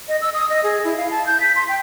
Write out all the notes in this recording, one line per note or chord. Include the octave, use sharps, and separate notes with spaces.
D#5
E6
D#6
D#5
G#4
E4
F5
A5
G6
B6
C6
G5